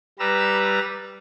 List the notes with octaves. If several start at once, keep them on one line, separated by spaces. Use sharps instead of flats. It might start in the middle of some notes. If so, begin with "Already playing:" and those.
G3 B4 A#5 E6